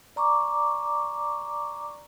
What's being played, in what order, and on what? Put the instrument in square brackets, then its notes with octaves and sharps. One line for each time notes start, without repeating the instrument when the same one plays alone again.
[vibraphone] D5 A#5 C#6 D6